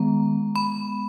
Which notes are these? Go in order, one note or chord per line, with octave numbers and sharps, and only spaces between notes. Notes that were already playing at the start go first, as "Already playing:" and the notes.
Already playing: D#3 G#3 B3 A#5
B5